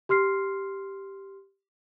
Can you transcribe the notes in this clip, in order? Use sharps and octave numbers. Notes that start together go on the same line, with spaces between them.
G4 C6 F6 C7